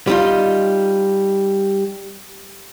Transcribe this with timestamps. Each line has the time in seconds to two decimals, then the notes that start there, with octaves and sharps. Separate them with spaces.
0.07 G3 D#4 F4